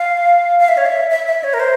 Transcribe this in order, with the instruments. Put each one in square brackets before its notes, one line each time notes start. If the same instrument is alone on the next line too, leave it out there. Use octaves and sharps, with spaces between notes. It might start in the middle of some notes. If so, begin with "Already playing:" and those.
Already playing: [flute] F5
F5
E5
C#5
E5
E5
E5
C#5
A#4
C5